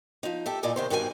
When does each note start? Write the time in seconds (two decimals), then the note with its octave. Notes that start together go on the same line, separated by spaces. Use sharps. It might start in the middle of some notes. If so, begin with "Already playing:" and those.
0.23 F3 D#4
0.46 G4 A4 E5
0.63 A#2 D#4 E4 D5 D#5 G#5
0.76 C3 D#3 C5
0.90 G2 B2 D#3 C4 F#4 G#5